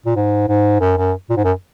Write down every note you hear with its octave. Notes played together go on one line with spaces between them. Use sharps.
A#2
G#2
G#2
F#2
F#2
A#2
G#2
F#2